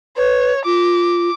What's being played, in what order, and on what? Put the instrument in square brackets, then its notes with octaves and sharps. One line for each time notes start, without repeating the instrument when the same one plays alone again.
[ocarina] B4 [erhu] C#5
[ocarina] F4 [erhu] D6